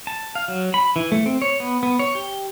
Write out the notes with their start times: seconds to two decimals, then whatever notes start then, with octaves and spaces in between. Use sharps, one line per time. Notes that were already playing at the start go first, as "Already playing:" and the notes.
0.07 A5
0.35 F5
0.48 F#3
0.74 B5
0.96 E3
1.12 A3
1.26 C4
1.42 C#5
1.60 B3
1.83 B3
1.99 C#5
2.15 G4